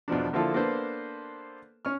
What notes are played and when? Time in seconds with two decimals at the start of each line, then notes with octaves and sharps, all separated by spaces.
0.08 E2 B2 F3 D4
0.33 D3 F3 A#3 E4 F4 A4
0.54 A#3 B3 D4 A4 B4 C5
1.85 C#4 C#6 F6